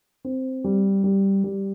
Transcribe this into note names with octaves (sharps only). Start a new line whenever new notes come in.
C4
G3
G3
G3